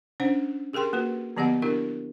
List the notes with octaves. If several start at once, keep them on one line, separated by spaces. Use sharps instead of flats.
C#4 D4 C5 F#5
G4 G#4 A#4 G5 C6
A#3 F#4 B4
D3 F3 B3 G4 D#5 F#5
D4 E4 G4 A#4